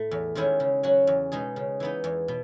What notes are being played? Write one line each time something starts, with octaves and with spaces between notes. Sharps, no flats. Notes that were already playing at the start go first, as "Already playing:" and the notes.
Already playing: A2 A3
E2
D#3 G#3 C#4 E4
C#3
F#3 C#4 F#4
E2
B2 G#3 D#4 G#4
C#3
E3 B3 D#4
E2
B2